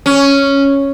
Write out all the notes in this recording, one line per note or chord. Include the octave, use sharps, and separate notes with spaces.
C#4